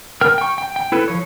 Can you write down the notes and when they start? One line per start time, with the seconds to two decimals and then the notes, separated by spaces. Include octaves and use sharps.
0.21 A#4 G5 F6
0.38 G5 C#6
0.58 G5
0.76 G5
0.92 E4 A4 B4
1.08 F3 C#5